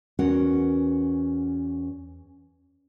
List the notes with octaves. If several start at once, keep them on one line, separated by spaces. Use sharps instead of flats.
E2 C#4 F#4 A#4 F#5